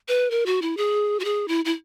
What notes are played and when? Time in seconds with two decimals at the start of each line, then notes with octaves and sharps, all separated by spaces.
0.08 B4
0.31 A#4
0.46 F#4
0.62 E4
0.77 G#4
1.20 F#4
1.25 G#4
1.48 E4
1.65 E4